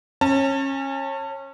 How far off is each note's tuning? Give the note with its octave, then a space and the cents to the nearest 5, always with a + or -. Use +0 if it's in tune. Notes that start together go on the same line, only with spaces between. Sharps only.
C#4 -25 A5 +25